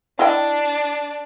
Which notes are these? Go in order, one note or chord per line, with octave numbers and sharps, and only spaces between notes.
D4 E4 D#5 G5